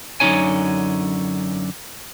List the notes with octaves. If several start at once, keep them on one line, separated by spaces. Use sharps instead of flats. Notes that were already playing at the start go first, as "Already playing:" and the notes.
F#2 D3 D4 D#4 C#5 G#5